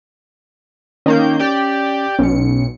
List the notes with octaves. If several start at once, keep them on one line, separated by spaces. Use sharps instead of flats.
D#3 A#3 C#4 G6
G4 D5 G5
B1 C#4 C#7